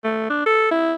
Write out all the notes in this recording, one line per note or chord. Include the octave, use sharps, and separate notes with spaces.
A3
D4
A4
E4